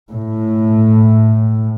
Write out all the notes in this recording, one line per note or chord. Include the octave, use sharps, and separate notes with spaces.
A2